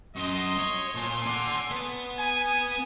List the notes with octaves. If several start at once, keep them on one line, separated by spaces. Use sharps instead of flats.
F#2 D#5 C6
C#5
A#2 A4 G#5 C6
D5 F#5
B3 B4
G#5